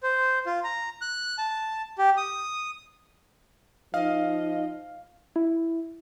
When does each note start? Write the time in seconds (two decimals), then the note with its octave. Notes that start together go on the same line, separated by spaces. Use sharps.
0.03 C5
0.46 F4
0.64 A#5
1.02 F#6
1.38 A5
1.98 G4
2.17 D#6
3.94 F3 D#4 D#5 F5
5.36 E4